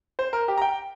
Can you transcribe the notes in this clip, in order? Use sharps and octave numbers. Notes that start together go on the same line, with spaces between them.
C5
A#4
G4
A#5
G5